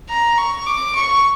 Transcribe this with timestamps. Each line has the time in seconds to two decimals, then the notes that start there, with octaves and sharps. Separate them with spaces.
0.09 A#5
0.38 C#6
0.67 D6
0.95 C#6